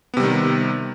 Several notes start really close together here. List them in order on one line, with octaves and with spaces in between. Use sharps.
B3 C3 G3 D#3